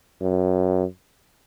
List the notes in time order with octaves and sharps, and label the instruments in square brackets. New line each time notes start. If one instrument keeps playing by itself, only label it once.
[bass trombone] F#2